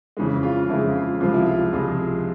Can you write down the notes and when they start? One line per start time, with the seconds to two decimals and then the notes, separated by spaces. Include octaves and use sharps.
0.17 F2 C#3 E3 G#3
0.43 F4
0.69 F2 C#3 E3 G#3 E4
0.95 F4
1.20 C#2 C3 F3 G#3 F4
1.34 E4
1.46 F4
1.73 C#2 C3 F3 G#3